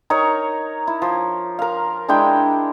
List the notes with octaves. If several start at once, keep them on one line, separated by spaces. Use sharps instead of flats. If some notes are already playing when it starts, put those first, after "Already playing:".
D#4 A#4 C#5 C#6
E4
F3
A#4 F5
G#3 D4 E4 G5